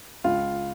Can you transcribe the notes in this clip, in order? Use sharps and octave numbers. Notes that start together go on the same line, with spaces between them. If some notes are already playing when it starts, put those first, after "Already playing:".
C#2 F4